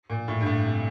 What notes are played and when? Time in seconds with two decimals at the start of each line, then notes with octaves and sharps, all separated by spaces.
0.10 A#2
0.28 A2
0.41 G2
0.46 A2
0.64 C3